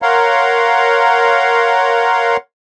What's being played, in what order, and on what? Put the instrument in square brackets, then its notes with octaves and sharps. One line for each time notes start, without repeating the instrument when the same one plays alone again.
[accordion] A#4 C#5 F5 F#5 A#5 C6